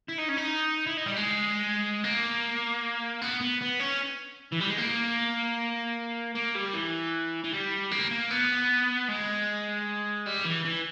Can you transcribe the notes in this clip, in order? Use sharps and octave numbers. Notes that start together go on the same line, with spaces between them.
E4
D#4
C#4
D#4
E4
D#4
G3
G#3
A#3
B3
B3
B3
C#4
E3
G3
G#3
A#3
A#3
G3
E3
E3
G3
A#3
A#3
B3
G#3
G3
E3
E3